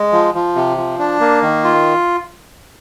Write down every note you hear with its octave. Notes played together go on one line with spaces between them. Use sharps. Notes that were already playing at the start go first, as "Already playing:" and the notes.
Already playing: G#3
F3
F3
C3
F3
D4
A#3
D#3
F4